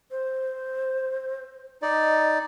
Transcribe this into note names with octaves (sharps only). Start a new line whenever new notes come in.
C5
D#4 D5 D#5